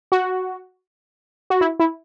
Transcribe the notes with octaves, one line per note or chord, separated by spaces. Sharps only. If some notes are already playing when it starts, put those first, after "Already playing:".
F#4
F#4
E4
E4